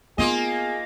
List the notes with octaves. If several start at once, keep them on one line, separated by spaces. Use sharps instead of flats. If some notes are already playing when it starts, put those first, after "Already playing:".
A#3 B3 F4 G#4 D#5